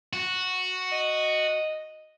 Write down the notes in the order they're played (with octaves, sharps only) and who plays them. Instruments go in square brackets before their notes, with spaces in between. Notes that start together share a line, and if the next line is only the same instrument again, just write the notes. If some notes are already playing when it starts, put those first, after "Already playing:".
[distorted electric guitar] F#4
[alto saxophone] D#5